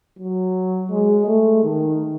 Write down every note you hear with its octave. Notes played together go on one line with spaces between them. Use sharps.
F#3
G#3
A3
D#3